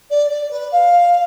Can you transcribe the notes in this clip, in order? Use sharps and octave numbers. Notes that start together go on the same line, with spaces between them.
D5
D5
B4
F5